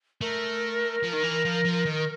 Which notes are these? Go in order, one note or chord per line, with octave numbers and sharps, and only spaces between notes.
A3 A#4
F3
D#3
E3
F3
F3
D#3